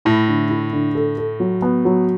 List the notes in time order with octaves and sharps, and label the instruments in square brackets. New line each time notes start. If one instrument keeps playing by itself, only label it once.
[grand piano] A2 [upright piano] E4
[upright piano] D3
E4
D3
A4
A4
F#3
B3
F#3